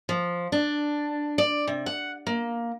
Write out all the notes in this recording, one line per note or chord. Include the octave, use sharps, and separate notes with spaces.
F3
D4
D5
C3
F#5
A#3